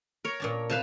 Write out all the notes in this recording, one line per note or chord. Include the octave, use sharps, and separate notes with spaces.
A#4 C#5
A#2 D4 A5
C3 B4 F5 A5